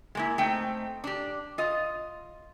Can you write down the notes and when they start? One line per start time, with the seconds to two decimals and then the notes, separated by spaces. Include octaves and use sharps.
0.15 G#3 A#3 E4
0.38 A3 C4 D#4 G5
1.04 D4 G4
1.58 F4 D#5